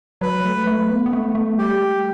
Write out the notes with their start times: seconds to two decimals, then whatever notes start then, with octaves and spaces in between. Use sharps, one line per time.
0.21 F#3 B4
0.45 A3
0.67 A3
0.90 B3
1.06 B3
1.13 A3
1.35 A3
1.58 G3 G4